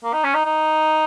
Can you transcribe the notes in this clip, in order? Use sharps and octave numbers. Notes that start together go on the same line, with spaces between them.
A#3
D#4
C#4
D#4
D#4